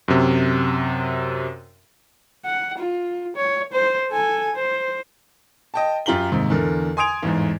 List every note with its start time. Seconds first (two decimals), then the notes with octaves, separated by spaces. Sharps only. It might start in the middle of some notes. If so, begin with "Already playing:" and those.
0.08 F#2 C3
2.45 F#5
2.78 F4
3.37 C#5
3.73 C5
4.12 A4 G#5
4.56 C5
5.74 D#5 G5 A5
6.06 F#2 F4 G4 A#5 F#7 G7
6.32 D#2 G#2 C3
6.50 E2 D3 A#4
6.97 G#5 C6 D#6 G#6 D7 F7
7.23 A1 E2 G#2